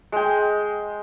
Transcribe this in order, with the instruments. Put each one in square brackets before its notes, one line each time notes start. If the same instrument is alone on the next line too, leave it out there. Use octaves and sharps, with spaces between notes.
[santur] G#3 G5